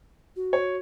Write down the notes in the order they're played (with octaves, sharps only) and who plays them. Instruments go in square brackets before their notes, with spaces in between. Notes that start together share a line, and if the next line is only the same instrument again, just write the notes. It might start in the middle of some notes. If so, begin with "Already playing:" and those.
[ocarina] F#4
[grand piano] C#5